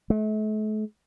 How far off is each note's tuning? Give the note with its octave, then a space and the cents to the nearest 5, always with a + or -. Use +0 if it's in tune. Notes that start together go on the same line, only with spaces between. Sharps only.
A3 -40